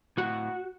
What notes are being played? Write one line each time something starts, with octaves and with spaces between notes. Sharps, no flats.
A2 F#4